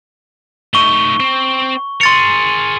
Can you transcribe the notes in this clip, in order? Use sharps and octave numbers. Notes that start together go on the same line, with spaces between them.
A3 D#4 C#6 G7
C4
G#4 A#4 C6 A6 C#7